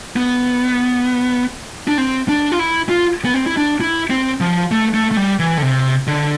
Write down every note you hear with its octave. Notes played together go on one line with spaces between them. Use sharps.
B3
D4
C4
D4
F4
E4
F4
B3
C4
E4
D4
E4
C4
F3
A3
A3
A3
G3
E3
D3
C3
D3